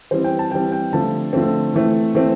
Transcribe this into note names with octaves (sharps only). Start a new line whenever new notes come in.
E3 G3 C4 C5
G5
A5
E3 G3 C4 G5
G5
D3 F3 A3 C4 A5
D3 F3 A3 C4
E3 A3 C4
E3 A3 C4